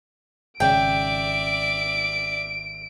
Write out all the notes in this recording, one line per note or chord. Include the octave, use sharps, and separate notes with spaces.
G#1 C#3 D5 E5 G5 D7